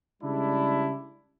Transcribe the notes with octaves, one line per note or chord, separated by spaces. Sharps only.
C#3 G3 G#3 D4 E4